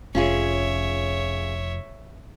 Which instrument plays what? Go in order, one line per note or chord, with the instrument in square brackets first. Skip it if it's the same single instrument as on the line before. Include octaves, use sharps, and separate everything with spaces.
[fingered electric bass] F1 [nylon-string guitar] C#4 F4 G#4 [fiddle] C#5 E5